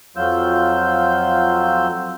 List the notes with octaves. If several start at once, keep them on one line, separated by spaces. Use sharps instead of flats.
F2 F#3 F4 E6 G6